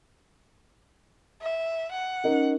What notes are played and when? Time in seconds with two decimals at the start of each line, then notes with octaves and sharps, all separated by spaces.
1.42 E5
1.91 F#5
2.24 C#4 D#4 A#4